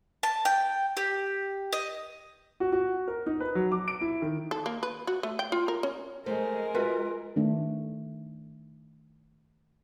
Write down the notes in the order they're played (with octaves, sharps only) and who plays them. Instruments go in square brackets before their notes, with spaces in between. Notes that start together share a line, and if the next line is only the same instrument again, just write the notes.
[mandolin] A5
G5
G4
D#5
[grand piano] F#4
F#4
A#4
D#4
B4
F#3
D6
D7
E4
D#3
[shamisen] A4
A#3
B4
F#4
A3
G5
F4
A#4
C#4
[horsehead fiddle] G#3 A#4 [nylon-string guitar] A3 C5
[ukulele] F4 B4 E5 [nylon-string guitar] F#4
[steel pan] D#3 A3 D4